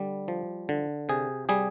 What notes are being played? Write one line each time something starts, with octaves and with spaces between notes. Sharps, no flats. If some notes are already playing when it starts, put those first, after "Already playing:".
Already playing: D3 G3
F3
D3
C3 G#4
G3 G#4